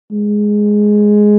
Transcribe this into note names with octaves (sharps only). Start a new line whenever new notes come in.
G#3